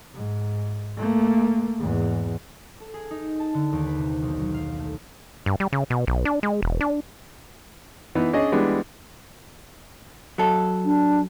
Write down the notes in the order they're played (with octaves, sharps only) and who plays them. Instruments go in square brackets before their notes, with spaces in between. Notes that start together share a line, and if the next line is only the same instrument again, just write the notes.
[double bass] G#2
A3 A#3
E2 G#2
[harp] A4
G#4
D#4
A5
D3
D#2
B4
C3
B1
F#3
F5
A3
[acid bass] G2
G3
C#3
B2
B1
D4
G#3
E1
D4
[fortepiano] E3 B3 D#4
C#4 D4 G#4 D#5
E3 G3 G#3 B3 D4
[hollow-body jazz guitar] F#3 A4
[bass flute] D4